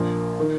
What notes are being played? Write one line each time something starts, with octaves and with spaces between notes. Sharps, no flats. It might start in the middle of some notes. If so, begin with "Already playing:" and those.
Already playing: A#1 A#2 F3 A#3
D#3